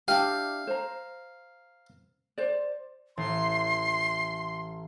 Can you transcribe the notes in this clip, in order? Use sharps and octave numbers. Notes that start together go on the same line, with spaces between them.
D4 E4 G4 F5
C5 A#5
C5 D5
A1 C6